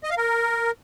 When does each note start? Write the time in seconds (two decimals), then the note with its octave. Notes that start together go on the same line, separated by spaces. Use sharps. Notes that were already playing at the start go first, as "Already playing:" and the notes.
0.03 D#5
0.10 F5
0.17 A#4